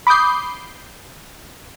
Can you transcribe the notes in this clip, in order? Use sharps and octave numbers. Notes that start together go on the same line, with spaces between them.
B5 D6 D#6 G6 C7